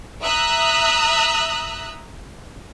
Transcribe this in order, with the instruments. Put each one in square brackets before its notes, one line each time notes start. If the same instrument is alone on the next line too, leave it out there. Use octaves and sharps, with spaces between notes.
[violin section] E5 A#5 D#6 E6 F#6